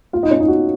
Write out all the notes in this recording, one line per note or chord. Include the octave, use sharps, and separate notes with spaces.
F4 F5
D#4 D#5
C#4 C#5
D#4 D#5
F#4 F#5